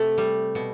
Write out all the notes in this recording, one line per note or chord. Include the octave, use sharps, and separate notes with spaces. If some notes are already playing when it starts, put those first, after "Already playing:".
Already playing: C3 A3
G3
B2